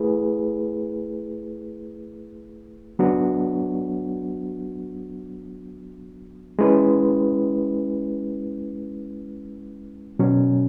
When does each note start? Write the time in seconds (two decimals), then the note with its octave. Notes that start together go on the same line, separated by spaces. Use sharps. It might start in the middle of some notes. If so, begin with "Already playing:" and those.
Already playing: A3 E4 G#4 B4
2.99 F#3 B3 D4 F#4
6.59 G#3 C#4 E4 B4
10.19 B2 F#3 C#4